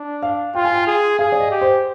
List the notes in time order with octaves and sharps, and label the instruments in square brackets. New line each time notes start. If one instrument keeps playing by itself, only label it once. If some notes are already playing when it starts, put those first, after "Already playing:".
Already playing: [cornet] D4
[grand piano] F5
[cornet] F4 [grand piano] G5
[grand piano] G#5
G5
[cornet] G#4
[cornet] G#4 [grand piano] F5
[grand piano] D5
D#5
[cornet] G4
[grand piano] C5